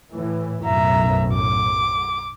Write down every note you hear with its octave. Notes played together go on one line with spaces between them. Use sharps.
A2 E3
B1 F#2 A2 E5 A#5
D6